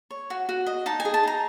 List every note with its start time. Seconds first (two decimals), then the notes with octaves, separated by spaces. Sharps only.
0.11 C#5
0.30 F#4
0.49 F#4
0.67 D#5
0.86 D#4 A5
1.00 G#5
1.05 G#4
1.14 A5
1.23 D#4 A#5